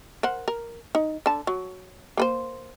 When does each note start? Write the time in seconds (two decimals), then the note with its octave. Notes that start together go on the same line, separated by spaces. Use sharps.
0.23 A#4 C5 F#5
0.48 A#4
0.95 D#4
1.26 D3 A5
1.47 F#3
2.17 A#3 B4 C5